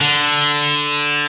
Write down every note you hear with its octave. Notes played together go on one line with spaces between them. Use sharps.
D3